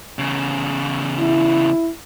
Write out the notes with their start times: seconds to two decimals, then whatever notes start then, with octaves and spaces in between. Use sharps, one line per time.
0.19 E2 C#3
1.20 E4